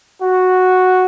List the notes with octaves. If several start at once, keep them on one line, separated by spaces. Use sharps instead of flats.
F#4